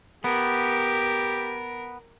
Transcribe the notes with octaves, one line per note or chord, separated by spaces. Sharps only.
B3 G4 A#4